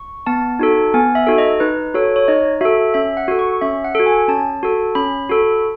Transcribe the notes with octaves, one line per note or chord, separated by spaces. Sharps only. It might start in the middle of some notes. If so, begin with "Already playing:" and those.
Already playing: C#6
B3 A5
D#4 F#4 A4
B3 G#5
E5
D#4 F#4 A4
D#5
D#4 B4
F#4 A4 C#5
C#5
D#4 D#5
F#4 A4 E5
C#4 E5
F#5
F#4 A4
C#6
C#4 E5
F#5
F#4 A4
G#5
C#4 A5
F#4 A4
C#4 B5
F#4 A4